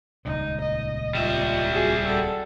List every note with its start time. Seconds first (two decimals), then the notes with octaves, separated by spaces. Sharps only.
0.25 D#1 C#2 A#2 D#4
0.61 D#5
1.15 G3 F4 E5
1.74 F#4 G#4
2.05 A4 F#5